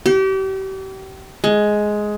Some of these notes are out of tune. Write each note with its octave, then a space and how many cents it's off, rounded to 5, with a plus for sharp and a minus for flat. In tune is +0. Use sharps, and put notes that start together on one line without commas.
G4 -35
G#3 +10